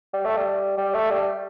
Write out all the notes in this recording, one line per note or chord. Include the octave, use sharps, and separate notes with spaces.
G3
A3
G3
G3
A3
G3